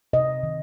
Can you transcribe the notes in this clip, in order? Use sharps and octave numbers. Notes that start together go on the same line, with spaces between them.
C3 D#5
D#3